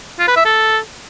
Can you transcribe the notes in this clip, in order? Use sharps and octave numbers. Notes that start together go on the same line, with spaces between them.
F4
B4
E5
A4